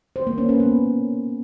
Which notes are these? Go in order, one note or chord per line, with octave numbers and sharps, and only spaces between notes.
C5
A#3
C#4
B4
B3